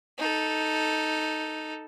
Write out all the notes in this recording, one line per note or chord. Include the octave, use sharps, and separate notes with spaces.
D#4 A4